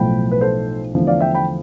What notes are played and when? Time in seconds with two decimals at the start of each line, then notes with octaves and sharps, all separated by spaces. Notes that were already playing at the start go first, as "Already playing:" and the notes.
Already playing: B1 A2 F3 A3 G5 B5
0.31 B4
0.41 A4 C5
0.94 E2 D3 F3 A3
1.07 D5 F5
1.21 E5 G5
1.34 G5 B5